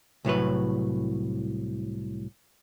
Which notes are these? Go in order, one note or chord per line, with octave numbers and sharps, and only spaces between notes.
C2 A2 F#3 B4